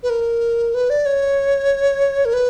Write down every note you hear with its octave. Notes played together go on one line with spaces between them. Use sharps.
B4
A#4
B4
D5
C#5
A#4
B4